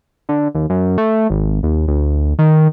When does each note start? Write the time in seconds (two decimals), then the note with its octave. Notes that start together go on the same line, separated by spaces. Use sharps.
0.29 D3
0.55 D#2
0.70 F#2
0.98 A3
1.30 G#1
1.63 D#2
1.88 D2
2.39 D#3